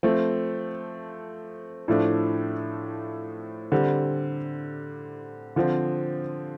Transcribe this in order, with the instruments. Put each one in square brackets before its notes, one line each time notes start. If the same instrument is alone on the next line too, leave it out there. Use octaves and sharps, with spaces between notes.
[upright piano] F3 A3 C4
A2 F3 A3 D4
D3 G3 C4
D3 F3 C4